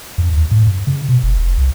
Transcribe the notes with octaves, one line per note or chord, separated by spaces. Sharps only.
F2
D#2
A2
F#2
C#3
B2
F#1
F1
C2